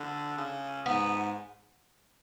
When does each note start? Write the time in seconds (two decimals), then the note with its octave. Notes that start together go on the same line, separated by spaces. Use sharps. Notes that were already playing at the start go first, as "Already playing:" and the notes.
Already playing: D3
0.37 C#3
0.86 G#2 B3